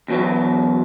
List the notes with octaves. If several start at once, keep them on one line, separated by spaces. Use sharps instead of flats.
E2 B2 F#3 B3